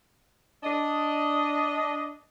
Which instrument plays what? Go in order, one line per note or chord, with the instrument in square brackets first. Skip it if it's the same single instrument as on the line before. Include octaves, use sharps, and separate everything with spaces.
[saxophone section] D4 D#5